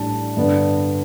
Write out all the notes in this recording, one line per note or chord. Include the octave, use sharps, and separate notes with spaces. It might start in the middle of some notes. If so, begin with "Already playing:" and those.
Already playing: A1 A2 G3 D4 A5
G2 D3 B3 D4